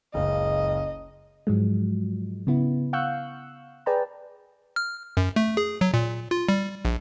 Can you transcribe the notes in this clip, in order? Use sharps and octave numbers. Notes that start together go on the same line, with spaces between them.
F#1 C#2 D#5
G#2 F3 F#3 G#3
C#3 B3 E4
F5 F#5 C#6 E6 F#6 G6
G#4 B4 D5 G5 A5 A#5
F6
F#2
A3
G#4
F#3
A#2
F4
G3
A#1